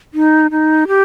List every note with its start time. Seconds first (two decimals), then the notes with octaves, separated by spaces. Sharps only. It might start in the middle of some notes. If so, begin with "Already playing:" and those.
0.14 D#4
0.51 D#4
0.88 G4